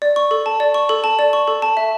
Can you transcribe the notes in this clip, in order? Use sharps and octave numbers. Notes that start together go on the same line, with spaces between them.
D5
C#6
A4
A5
D5
C#6
A4
A5
D5
C#6
A4
A5
E5